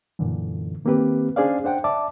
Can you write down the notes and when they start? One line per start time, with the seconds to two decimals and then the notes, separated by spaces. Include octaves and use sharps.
0.19 F#2 A#2 D3 E3
0.85 D#3 A#3 C4 G4 B4
1.36 C#4 D4 G#4 C5 D5 F5
1.64 D4 C5 F#5 G5
1.84 D5 E5 A5 D6